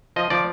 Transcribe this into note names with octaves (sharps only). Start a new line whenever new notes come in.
F3 D#5
F3 D5